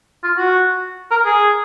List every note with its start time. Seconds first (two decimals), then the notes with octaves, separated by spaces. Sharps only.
0.23 F4
0.37 F#4
1.11 A#4
1.25 G#4